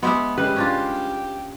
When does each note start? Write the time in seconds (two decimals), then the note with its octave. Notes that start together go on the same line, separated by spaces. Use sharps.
0.03 G#3 B3 G4 E5
0.38 C#3 G3 G#3 G4 B4
0.56 C#4 D4 F4